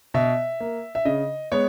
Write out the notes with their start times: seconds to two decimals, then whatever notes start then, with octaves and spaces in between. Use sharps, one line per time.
0.14 B2 E5
0.60 A#3
0.95 E5
1.05 C#3 D#5
1.52 G#3 B3 C#5